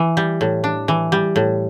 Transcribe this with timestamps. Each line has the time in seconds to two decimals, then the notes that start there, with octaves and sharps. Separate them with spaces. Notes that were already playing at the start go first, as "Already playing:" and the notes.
Already playing: E3
0.17 G3
0.41 A2
0.64 D4
0.88 E3
1.12 G3
1.36 A2